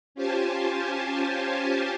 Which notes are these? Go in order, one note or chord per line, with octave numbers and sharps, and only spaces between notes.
C#4 F4 G4 C5 G#5 A5